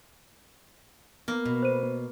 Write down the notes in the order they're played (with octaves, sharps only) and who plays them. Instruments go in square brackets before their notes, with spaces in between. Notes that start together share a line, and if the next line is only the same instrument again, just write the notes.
[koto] A#3 [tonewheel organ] B3
[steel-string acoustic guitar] B2
[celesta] C5 D#7